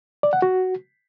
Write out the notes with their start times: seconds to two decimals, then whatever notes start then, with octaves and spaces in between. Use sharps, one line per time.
0.23 D5
0.33 F#5
0.42 F#4